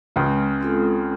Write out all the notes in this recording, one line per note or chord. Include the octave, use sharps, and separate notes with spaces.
C#2 C#3 G#3
C4 F4 A4